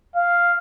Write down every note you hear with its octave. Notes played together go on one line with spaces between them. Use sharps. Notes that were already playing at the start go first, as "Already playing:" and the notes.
F5